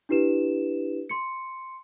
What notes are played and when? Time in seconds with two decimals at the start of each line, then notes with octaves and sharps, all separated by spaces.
0.09 D4 E4 G4 B4 E7
1.09 C6 C#7